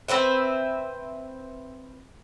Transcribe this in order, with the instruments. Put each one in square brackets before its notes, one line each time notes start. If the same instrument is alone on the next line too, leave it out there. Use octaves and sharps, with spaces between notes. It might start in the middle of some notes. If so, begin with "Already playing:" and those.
[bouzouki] C4 B4 C5 E5